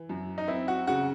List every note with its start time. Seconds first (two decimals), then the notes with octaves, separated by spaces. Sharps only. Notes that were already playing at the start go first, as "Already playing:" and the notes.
Already playing: E3
0.09 F#2
0.38 D#4
0.48 C4 E4
0.68 F#4
0.87 C#3 F#4